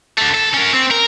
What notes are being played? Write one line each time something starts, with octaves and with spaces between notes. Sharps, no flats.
D3 A3
A4
C#4 A#4
C4
A#4